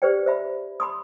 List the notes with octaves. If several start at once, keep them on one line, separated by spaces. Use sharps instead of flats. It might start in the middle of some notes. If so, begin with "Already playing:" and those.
G4 B4 C5 D5 G5
C5 E5 B5
B5 C6 D#6